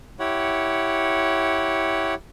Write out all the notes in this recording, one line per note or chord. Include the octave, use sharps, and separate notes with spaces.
E4 G4 C#5 F#5